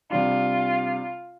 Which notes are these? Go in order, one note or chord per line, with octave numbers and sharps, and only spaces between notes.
C3 G3 D4 F4